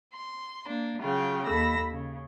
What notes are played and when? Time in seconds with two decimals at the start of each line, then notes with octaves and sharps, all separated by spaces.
0.14 C6
0.67 A#3 D4
1.01 C#3 F#3 F4 G5
1.46 D#2 A4 B5 E6 A#6
1.91 C#3